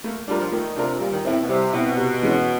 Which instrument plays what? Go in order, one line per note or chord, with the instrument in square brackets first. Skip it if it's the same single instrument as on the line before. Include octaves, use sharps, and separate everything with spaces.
[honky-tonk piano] A3 [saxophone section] A#3
[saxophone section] G3 [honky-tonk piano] D4 F4 A#4
[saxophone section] F3
[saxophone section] D#3 [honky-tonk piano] A3
[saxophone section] C3 [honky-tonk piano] D4 F4 A#4
[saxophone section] A#2 [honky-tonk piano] G3
[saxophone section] D#3
[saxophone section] A2 [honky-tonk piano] C4 E4
[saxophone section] B2
[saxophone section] C3 [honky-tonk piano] G3
[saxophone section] B2 [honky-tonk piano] C4 E4
[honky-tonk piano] C3
E3 G#3 C#4